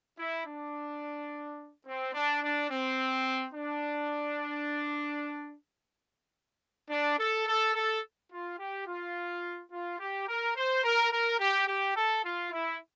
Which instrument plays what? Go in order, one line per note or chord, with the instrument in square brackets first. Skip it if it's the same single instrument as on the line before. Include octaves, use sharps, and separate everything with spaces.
[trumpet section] E4
D4
C4
D4
D4
C4
D4
D4
A4
A4
A4
F4
G4
F4
F4
G4
A#4
C5
A#4
A#4
G4
G4
A4
F4
E4